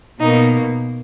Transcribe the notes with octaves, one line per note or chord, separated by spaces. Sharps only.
B2 A#3 D#4